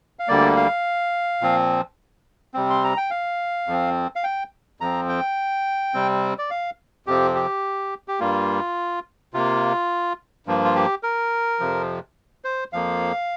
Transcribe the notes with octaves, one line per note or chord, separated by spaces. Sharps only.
F5
D2 D3 G3 A#3 D5
F5
A#2 F3 C4
C3 G3 C4
C6
A#5
G5
F5
F2 F3 C4
F5
G5
F2 F3 C4 A#5
G5
C3 G3 C4
D5
F5
F2 C3 F3 C4 G4
G4
G4
G2 G3 A#3 F4
C3 A#3 F4
G2 F3 A#3
F4
G4
A#4
F2 C3 F3
C5
F2 F3 A#3 F5